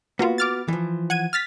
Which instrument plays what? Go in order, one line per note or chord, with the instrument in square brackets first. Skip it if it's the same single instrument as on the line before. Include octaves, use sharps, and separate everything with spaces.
[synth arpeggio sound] A#3 F4 [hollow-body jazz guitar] B3 F#4
[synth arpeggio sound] D6 F6 A6
[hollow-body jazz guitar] E3 F3
[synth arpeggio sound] F#5 G#6 D#7
F6 A6 B6